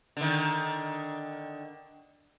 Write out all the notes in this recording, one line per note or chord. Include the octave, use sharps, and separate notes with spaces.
D3 D#3